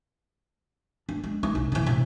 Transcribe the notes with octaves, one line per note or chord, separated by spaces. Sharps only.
D4
G#3
D#4
C2
C#3 E3
C3 E3